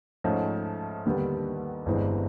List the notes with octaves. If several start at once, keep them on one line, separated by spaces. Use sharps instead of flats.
G#2 F3 A3 C#4
D#2 D3 G3 B3
G1 G2 E3 G#3 C4